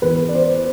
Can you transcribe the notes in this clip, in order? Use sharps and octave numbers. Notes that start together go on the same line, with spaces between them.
E2 B4
D5
C5